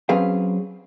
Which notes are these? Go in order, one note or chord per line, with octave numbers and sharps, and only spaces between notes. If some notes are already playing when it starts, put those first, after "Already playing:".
F#3 C4 C#4 G#4 B4 F5